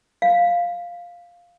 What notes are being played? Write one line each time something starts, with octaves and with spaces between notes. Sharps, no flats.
F5